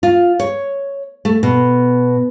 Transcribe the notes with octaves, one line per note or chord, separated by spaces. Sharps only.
F4
C#5
A3
B2